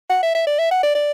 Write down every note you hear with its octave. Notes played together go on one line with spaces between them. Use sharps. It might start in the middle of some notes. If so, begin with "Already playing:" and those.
F#5
E5
E5
D5
E5
F#5
D5
D5